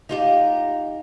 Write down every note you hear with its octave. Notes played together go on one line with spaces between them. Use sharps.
D#4 F4 G4